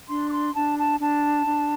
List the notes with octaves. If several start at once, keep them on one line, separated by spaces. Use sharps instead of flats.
D4 C6
D6
C6
D4 A5
A5
D4 A5
D4